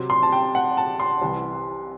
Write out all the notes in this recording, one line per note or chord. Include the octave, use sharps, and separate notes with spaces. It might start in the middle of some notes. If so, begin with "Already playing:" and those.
Already playing: C3 F#3 C4
C6
A5
G5
F#5
A5
C6
C2 C3 E3